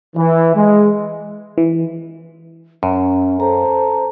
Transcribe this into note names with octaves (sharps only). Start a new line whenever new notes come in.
E3
G#3
E3
F#2 C#4
A4 C5 A#5